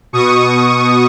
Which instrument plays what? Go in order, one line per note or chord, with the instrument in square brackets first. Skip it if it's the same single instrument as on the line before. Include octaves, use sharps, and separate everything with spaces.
[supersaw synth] B2 C#6 D#6